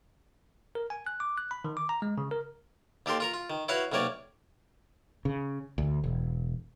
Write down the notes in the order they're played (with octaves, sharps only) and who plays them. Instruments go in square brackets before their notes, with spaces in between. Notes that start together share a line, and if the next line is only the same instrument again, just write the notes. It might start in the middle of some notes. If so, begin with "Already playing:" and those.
[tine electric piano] A#4
G#5
F#6
D6
F#6
B5
D#3
D6
A#5
G#3
C#3
A#4
[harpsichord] D#2 G4 A4 A#4 C6
F4 A#4 A#5
F4
D#3
E4 F#4 B4 C#5 F5 F#5
B1 C3 A#3 A#4 C#5 D5
[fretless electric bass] C#3
D2
E1